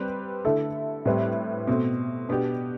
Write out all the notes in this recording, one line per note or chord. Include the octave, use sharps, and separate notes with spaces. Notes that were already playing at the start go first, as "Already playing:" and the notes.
Already playing: G3 C4 G4 B4
D3 A3 E4 A4
A2 G3 C4 G4 B4
B2 A3 C4
B2 B3 D4 G4